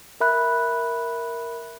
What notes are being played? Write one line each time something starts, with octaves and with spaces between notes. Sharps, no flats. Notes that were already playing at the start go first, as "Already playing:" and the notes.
A#4 E5 B5 F#6